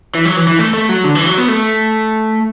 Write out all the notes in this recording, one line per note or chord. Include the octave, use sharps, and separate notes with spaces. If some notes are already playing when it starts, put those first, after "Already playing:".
E3
F#3
E3
E3
A3
A3
F#3
D3
E3
F#3
B3
A3